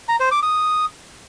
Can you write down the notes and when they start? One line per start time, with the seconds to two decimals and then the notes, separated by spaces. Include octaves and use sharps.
0.09 A#5
0.20 C5
0.31 D6
0.43 D#6